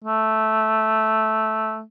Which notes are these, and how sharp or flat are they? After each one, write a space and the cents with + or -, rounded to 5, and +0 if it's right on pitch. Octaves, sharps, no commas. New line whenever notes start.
A3 -5